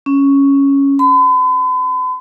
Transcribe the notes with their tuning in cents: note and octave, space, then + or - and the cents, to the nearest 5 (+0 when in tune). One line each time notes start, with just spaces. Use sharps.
C#4 +0
B5 +45